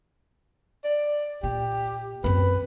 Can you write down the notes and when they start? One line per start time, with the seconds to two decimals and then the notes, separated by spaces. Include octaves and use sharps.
0.84 D5
1.43 A#2 G4
2.24 F#2 C4 B4